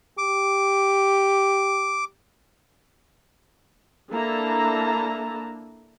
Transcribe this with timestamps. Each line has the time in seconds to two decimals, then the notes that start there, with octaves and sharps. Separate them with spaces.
0.18 G4 D6
4.12 A#3 D4 E4 A4 A5 A#5